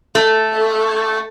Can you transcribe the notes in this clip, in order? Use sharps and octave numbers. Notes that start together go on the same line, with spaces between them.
A3